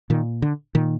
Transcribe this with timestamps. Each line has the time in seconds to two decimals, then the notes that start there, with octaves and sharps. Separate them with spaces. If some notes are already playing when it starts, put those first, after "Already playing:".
0.10 A#2 D#3
0.42 D3
0.75 A#2 D#3